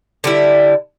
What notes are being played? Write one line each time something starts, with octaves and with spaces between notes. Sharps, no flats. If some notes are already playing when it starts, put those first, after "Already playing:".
D3 G3 E4